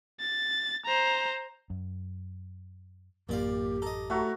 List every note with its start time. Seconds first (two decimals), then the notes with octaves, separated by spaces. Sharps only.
0.20 A6
0.85 C5 A#5
1.70 F#2
3.29 A1 F#2 A#2 G4 D5 F5
3.82 A4 D#5 A#5
4.10 A2 A3 F#4 A#5